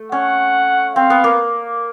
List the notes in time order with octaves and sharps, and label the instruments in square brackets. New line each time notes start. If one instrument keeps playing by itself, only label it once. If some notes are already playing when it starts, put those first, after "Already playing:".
Already playing: [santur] A3
[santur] C#4 [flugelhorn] F#5
[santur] C4 [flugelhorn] F5
[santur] B3
A#3